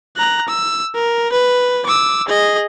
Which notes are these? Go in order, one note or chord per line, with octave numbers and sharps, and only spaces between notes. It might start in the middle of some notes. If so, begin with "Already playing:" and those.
A#5 F#6
E6
A#4
B4
D6 E6
G#4 D#5